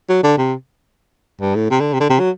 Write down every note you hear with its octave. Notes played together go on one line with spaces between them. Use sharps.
F#3
D3
C3
G2
A2
C3
D3
C3
D3
C3
F#3